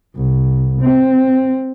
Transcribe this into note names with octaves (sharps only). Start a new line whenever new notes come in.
C2
C4